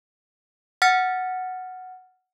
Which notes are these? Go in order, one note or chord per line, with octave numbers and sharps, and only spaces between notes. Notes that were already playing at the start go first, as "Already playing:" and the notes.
F#5 F6 A6 C#7